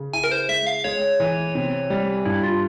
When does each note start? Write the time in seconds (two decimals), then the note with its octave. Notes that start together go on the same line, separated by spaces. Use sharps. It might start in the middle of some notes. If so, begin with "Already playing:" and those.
Already playing: C#3
0.13 E4 G#5
0.24 A#4
0.31 C5
0.49 G#3 E5
0.67 F5
0.84 G#3 C#5
1.20 E3
1.55 C3
1.90 G3
2.26 G2 E4
2.43 F4